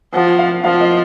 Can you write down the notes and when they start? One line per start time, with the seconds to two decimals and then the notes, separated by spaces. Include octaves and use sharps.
0.13 F3 F#5
0.39 F5
0.64 F3 F5
0.81 D#5